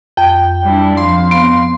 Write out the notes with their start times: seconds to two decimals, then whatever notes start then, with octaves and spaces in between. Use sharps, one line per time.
0.17 F2 G5
0.64 G3 D4 E4
0.97 F2 F5 C6
1.31 B3 C6